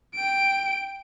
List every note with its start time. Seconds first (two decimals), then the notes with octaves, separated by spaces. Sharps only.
0.15 G5 D7